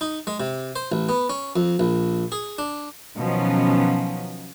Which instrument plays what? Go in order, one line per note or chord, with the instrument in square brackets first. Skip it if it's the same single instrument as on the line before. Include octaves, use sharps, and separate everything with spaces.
[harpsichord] D#4
G#3
C3
C5
A1
B3
C#4
F2
A#1
G#4
D4
[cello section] B2 D#3 F3 F#3 B3 C#4